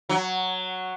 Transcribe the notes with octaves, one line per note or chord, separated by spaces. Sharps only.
F#3